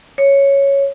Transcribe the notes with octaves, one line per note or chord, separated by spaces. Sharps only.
C#5